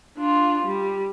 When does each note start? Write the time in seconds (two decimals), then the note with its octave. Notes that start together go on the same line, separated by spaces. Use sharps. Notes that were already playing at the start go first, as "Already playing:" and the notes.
0.18 D4 F4
0.65 G3